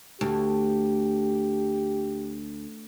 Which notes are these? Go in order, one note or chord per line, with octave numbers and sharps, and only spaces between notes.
D2 G4